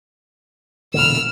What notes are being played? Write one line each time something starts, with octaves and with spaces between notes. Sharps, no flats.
E1 A#2 D3 E6 F6